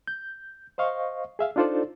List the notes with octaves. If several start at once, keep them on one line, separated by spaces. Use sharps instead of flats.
G6
C5 D#5 F5 C#6
G#4 E5 F5
D4 D#4 F4 A4 C5 D5